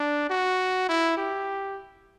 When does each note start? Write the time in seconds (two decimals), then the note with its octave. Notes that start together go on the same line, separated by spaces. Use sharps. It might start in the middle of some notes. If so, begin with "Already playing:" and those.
Already playing: D4
0.30 F#4
0.89 E4
1.17 G4